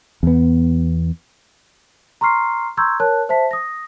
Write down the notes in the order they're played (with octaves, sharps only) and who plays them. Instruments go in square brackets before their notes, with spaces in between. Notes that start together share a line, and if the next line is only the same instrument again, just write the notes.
[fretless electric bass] E2 B3
[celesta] A#5 C6 C#6 F6 C7
A#5 C6 C#6 E6 G6 G#6
A#4 C#5 A5 F#6
C5 E5 A5 B6
D#6 A#6